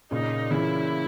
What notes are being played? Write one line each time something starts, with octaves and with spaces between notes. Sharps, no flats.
A#2 C#3 D#4
C#3 E3 E4